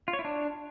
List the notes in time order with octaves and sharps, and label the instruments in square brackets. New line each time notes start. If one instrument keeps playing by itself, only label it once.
[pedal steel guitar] F4
C#5
E4
D4